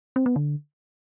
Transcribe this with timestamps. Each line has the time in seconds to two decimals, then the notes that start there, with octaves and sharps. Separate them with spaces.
0.16 C4
0.26 B3
0.36 D3